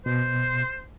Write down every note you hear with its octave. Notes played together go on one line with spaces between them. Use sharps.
B2 C5